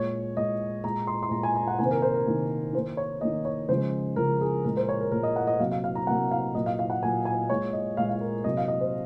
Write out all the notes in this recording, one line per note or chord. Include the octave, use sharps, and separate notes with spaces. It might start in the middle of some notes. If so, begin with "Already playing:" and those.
Already playing: A#2 G#3 C#5
A#2 G#3 D#5
A#2 G#3 A#5
C6
C6
A#2 G#3 A#5
G#5
A#5
F#5
C3 D#3 A#3 G#5
C5
A#4
C5
A#4
C3 D#3 A#3
D#3 A#3 C5
C#5
D#3 A#3 D#5
C#5
C#3 F3 G#3 C5
C#3 F3 G#3 A#4
G#4
A#2 G#3 A#4
C5
C#5
A#4
A#2 G#3 A#4
D#5
F#5
D#5
C3 F#3 A#3 F5
F5
F5
A#5
C3 F#3 A#3 F#5
F5
A#2 F#3 A#3 D#5
F5
F5
F#5
A#2 F#3 A#3 G#5
G#5
A#2 G#3 C#5
D#5
A#2 G#3 F5
F5
A#4
C3 F#3 A#3 D#5
F5
D#5
C5